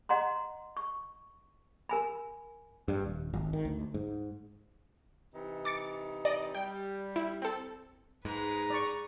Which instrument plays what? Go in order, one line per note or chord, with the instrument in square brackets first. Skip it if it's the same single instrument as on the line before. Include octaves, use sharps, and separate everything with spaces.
[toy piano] D#5 F#5 A#5 C6
C#6
A#4 G#5 B5
[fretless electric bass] G2
D#1
G#1
D#3
D2
G#2
[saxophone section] C3 E3 D#4
[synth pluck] D6 A6 C#7
D5 D#5
[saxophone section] G3 [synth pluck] G5
[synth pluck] E4
C4 A4
[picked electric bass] G#2 [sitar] G#3 [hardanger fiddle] B4 A#5
[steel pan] D5 C#6